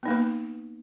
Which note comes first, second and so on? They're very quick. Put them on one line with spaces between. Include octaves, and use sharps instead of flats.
B3 D#4 A#3 B4